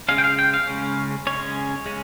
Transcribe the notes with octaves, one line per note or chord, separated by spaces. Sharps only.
C#3 G#3 C#4 F5
G5
F5
G5
F5
C#3 G#3 C#4
C#3 G#3 C#4 C#5
C#3 G#3 C#4